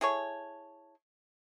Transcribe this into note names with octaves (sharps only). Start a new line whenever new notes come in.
E4 G#4 A4 C#5